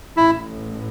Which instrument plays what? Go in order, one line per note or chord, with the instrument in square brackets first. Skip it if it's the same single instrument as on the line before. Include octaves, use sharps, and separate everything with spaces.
[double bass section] A1 A2 [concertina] E4